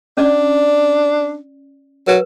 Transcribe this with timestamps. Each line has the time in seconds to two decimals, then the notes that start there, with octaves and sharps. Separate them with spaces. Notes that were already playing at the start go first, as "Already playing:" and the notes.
0.17 C#4 D4 D5
2.07 F#3 A#4 B4